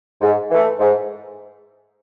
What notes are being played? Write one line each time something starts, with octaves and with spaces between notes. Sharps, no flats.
G#2
E3 A3
G#2